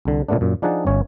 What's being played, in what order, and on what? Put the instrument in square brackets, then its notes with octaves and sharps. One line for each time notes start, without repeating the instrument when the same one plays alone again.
[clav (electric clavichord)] C2 D3
A#2 C#3 A3 B3 D4
F#2 A#2
F3 D4 D#4 G#4 F#5 A5
G1 C#4 C#5